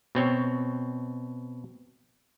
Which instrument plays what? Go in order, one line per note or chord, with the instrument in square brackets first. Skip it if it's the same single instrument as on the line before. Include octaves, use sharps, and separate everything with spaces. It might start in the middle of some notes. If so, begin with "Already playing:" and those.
[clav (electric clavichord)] B2 C4 C#5